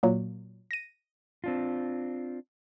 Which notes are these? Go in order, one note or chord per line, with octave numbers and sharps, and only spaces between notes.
A#2 F#3 A#3
A#6 D#7
C4 D4 F4